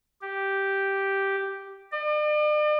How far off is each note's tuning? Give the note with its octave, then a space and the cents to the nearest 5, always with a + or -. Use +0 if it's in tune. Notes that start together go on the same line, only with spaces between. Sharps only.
G4 -5
D5 +45